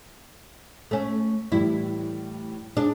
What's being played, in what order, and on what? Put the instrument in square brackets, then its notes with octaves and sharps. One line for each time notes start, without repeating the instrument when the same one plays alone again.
[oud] A3 C#4
[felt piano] A2 E3 G3 [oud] E4
[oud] D4 [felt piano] G#4